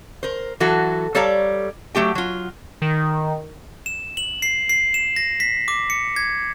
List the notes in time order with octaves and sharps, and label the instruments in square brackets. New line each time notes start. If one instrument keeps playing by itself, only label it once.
[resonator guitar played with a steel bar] A#4 C5
E3 F#3 F#4 A4
G3 A4 C#5 D5 F5 A#5
F#3 A3 G4 G5
F#3 F4
[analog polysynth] D#3
[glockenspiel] E7
F#7
C7
C7
E7
A#6
B6
D6
C#7
G#6